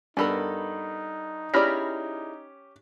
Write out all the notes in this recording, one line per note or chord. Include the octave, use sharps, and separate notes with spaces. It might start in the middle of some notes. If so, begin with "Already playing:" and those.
G2 B3 D#4 A4 A#4 B5
C#4 E4 G4 G#4 D5 B5 F6 A#6